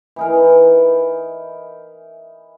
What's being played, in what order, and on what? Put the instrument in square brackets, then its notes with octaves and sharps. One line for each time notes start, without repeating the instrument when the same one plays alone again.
[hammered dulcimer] E3 D#4 A#4